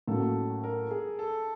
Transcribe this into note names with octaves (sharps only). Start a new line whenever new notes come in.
A2 F#3 A#3 C#4 A4
A#4
G#4
A4